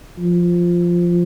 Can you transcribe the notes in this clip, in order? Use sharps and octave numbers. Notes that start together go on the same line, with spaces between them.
F3